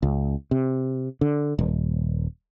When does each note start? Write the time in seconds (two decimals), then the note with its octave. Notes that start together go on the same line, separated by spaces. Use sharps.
0.03 C#2
0.51 C3
1.21 D3
1.59 D#1